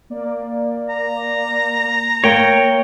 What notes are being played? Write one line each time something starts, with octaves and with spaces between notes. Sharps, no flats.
A#3 D5
A#5
A#3 C#5 G5